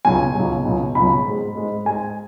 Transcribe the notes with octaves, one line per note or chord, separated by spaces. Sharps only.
C#2 B2 F#3 G#5
C#2 B2 F#3
C#2 B2 F#3
C#2 B2 F#3 B5
G#2 G#3
G#2 G#3
G#2 G#3 G#5